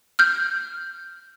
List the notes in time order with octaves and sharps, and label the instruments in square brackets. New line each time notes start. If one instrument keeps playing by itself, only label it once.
[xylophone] F6 G6